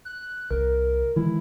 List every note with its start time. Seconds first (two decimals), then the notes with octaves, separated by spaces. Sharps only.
0.05 F#6
0.51 C2 A#4
1.16 D#3 E3 G#3 E4